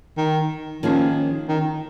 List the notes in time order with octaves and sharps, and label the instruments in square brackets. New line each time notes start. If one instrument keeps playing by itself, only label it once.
[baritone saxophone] D#3
[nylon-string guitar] D#3 A#3 C#4 G#4 [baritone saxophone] F3
[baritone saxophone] D#3